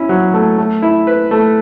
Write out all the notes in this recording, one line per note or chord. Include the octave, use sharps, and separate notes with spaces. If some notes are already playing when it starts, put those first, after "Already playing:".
Already playing: C#4 E4
F#3
A3
A3
E4
B4
A3